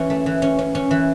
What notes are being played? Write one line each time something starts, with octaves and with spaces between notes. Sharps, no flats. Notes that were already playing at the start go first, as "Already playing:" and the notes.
Already playing: E3 C#4
A3
E3
C#4
C#4
C#4
E3